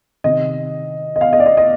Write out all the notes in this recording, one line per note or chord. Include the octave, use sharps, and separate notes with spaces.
C3 D#3 D#5
D#5
F5
D#5
D5
D#5
D#5